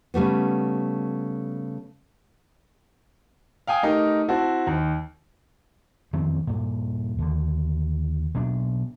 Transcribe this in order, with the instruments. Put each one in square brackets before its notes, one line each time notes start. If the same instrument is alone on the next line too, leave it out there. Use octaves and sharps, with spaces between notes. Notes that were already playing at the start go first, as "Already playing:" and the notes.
[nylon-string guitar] C#3 G3 A3 B3
[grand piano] F5 G5 G#5 D#6
A3 D#4 G4 A#4
C4 E4 F#4 A5
D#2
[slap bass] F2 D#3 E3 C4
G2 A#2
D#2 D3
B2 F#3 D4